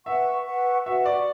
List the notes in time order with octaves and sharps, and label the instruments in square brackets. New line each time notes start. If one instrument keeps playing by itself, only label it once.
[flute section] B4 F#5 C#6 [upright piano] E5
[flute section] B4 F#5 C#6
[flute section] F#4 B4 F#5 C#6 [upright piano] E5
[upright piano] D5